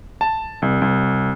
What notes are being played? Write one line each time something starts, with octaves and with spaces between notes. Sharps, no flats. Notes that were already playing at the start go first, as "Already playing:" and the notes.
A5
C2
C2